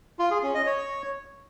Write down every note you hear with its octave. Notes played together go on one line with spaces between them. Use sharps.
F4
G#4
C#4
D#5
C#5